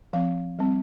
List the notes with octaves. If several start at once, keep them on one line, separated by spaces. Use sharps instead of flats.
F3 C4 F5
G3 C4